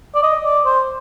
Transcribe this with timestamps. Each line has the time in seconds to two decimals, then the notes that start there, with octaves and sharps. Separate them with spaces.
0.15 D5
0.23 D#5
0.44 D5
0.65 C5